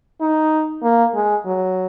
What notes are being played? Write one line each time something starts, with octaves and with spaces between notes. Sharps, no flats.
D#4
A#3
G#3
F#3